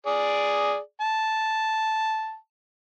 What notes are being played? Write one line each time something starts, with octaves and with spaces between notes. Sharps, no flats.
G#4 D5
A5